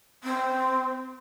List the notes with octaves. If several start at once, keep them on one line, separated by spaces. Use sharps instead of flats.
C4